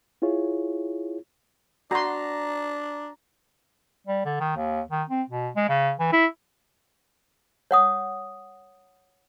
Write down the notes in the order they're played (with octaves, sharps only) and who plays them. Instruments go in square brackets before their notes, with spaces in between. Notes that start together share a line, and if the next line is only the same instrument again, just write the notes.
[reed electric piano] E4 F4 G#4 C#5
[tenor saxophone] D4 [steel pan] F#4 C6 [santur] A#5
[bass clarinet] G3
D3
D#3
D#2
D#3
C4
B2
G#3
C#3
E3
E4
[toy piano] C#5 F#5 D#6